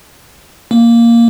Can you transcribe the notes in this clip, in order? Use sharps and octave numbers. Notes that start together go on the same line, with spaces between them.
A#3